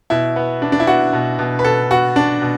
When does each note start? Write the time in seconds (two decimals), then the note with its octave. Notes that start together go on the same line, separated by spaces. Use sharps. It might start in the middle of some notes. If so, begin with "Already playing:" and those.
0.10 B2 E4
0.36 B3
0.62 D4
0.72 D4
0.80 E4
0.87 B3 F#4
1.13 B2
1.39 B2
1.59 B4
1.65 B2 A4
1.91 B3 F#4
2.16 D4
2.42 B2